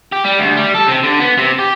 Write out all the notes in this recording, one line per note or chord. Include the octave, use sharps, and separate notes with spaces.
G4
G3
D2
G3
A4
C3
D3
B3
C3
G4